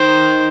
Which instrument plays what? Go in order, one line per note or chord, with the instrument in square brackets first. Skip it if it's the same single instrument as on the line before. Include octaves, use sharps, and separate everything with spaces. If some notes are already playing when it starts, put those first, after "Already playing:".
Already playing: [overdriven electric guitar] D#3 [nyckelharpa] C5